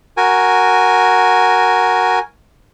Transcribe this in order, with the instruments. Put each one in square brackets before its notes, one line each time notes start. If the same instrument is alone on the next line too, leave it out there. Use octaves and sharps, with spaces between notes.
[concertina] F#4 A#4 G#5